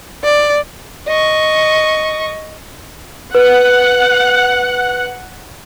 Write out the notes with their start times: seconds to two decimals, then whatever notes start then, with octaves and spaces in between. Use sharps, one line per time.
0.24 D5
1.08 D#5 C#6
3.35 B4 F#5